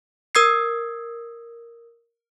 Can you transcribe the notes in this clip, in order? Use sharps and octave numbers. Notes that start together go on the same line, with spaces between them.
A#4 D#6 E6 G#6 C7